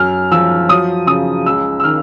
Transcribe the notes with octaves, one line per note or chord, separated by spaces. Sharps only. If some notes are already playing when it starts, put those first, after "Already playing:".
Already playing: F#2 F6
F3 E6
F#3 D#6
C#3 D#6
C#2 E6
E6
D#3 F6